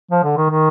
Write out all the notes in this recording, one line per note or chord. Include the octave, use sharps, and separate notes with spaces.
F3
D3
D#3
D#3